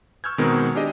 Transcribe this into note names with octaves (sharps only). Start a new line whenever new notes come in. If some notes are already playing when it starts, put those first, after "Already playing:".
C#6 E6 F6 G6 G#6
B2 D#3 G#3 B3 C4 A#4
D4 G4 G#4 D#5